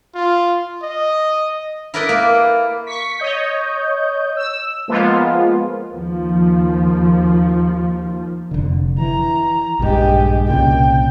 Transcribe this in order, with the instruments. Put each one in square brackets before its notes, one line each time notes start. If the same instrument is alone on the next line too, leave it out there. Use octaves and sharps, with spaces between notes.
[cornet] F4
D#5
[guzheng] E4 A#4 B4 D5 D#5
A#3 D5
[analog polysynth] C#6 B6
C#5 D#5 G6
E6
F3 G#3 A#3 B3 F4
[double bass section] D#2 F3
[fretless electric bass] F1 D3
[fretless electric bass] E3 [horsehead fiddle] A#5
[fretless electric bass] A#1 G2 [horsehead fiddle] G#3 G4
[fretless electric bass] C2 A#2 C#3 [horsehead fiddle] G5